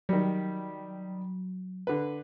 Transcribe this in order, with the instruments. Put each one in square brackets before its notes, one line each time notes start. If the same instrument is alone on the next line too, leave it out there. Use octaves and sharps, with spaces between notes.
[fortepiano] D#3 G3 [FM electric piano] F#3
[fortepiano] D3 B4